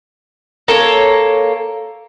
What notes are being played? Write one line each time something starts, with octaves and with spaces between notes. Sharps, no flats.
A#3 A4 C#5